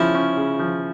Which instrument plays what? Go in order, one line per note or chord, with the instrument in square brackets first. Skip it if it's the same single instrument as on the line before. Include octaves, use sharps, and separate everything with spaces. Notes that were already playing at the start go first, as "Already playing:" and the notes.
Already playing: [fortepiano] C#3 F3 C#4 [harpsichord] E4
[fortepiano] C#4
C#3
F3